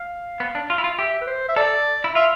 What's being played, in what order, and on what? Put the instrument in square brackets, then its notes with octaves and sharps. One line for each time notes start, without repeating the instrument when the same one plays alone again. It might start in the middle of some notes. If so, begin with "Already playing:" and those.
Already playing: [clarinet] F5
[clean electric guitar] B3
D4
F4
E4
F4
[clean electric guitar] G4 [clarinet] E5
[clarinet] B4
C5
E5
[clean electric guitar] A4 [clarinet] D5
[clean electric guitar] E4
[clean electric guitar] F4 [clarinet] E5